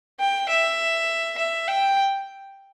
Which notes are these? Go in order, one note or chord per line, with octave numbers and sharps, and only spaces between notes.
G5
E5
E5
G5